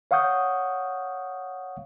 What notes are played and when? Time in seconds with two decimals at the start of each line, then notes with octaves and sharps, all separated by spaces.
0.11 C#5 F5 F#5 C#6 D#6 G6